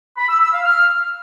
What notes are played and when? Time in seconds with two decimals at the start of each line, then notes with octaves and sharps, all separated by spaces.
0.17 B5
0.29 E6
0.41 E6
0.53 F5
0.65 F6